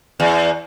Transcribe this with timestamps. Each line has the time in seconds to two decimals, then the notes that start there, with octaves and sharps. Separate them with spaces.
0.20 E2